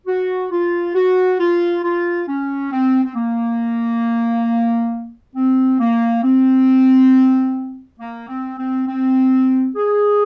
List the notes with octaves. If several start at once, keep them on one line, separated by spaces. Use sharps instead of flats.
F#4
F4
F#4
F4
F4
C#4
C4
C4
A#3
C4
A#3
C4
A#3
C4
C4
C4
G#4